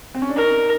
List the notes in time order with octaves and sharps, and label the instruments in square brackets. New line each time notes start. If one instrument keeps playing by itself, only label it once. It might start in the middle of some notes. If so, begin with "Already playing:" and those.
[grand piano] C4
C#4
D4
[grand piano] D#4 [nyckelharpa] A#4